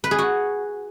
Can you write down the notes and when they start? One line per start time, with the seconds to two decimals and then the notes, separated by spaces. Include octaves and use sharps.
0.04 B4
0.11 G#4
0.18 F#4